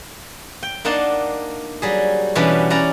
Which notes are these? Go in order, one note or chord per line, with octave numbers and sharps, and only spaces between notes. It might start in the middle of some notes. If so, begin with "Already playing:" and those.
G5
A#3 D4 D#4 F#5 A5 C6
F#3 G3 G#4
B2 E3 G3 B3 C#4 D4
C#4 E4 D5 F#5 A#5